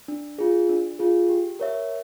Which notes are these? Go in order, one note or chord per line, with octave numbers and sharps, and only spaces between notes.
D4
F4 G#4
D4
F4 G#4
G4
A#4 C#5 E5